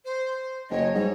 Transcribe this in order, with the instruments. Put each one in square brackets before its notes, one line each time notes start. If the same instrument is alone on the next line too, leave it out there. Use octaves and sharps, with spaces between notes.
[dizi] C5
[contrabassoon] F#1 [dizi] C#5 [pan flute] D#5
[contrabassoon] G#2 [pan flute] G3 [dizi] C#5